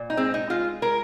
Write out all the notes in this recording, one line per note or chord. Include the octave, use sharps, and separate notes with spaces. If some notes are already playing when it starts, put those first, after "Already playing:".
Already playing: A#2
D#4
G#3 C4
D#4
G#3 F4
G#3 A#4